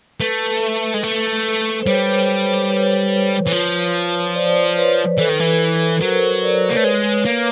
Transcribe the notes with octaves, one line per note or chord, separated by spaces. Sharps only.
A3 A4 B4
G#3
A3
C5
G3 B4 C#5
B4 C#5
E3
F3
C5 D5
B4 C#5
E3 A4 B4
D#3
E3
F#3 A#4 C5
D5
C#5
C5
A#3 B4 C#5
A3
G#3 B4 C#5
A#3